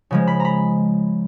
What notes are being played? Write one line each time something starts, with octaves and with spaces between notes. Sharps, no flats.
C#3 F3 G#3
B5
A#5 B5